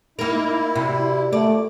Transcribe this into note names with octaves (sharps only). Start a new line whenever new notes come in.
A#3 D#4 E4 A#4
C3 F#4 A#4 D5
A#2 A3 D5